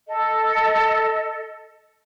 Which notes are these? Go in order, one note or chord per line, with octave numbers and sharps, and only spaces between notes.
A4 D#5